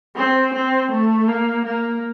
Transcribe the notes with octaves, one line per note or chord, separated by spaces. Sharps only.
C4
C4
A3
A#3
A#3